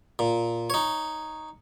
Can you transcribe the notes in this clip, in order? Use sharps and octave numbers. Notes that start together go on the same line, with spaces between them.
A#2
D#4 C#5